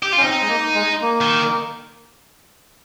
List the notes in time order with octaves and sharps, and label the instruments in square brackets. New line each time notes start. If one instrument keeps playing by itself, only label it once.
[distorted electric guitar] G4
F4
[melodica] C#4
[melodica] C4 [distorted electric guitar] D#4
[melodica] G#3
A#3
G#3
A#3
[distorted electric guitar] D#3